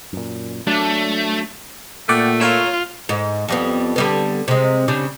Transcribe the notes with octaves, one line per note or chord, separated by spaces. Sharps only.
F#2 A#2
F#3 A3 D4
A#2 A3 D5 F#5 G5
F4 A#4 C#5 E6
G#2
F2 G3 B3
D3 G3 B3
C3 G#3
C#3 G3 D4